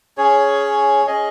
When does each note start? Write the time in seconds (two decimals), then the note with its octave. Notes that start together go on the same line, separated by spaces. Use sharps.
0.18 C#4 G#4 C#5
1.06 C#4 G#4 D#5